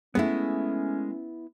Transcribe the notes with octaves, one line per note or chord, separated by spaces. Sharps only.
G#3 A3 B3 C#4 E4